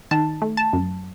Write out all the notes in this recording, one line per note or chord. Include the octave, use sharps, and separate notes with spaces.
D#3 A5
A3
A5
F#2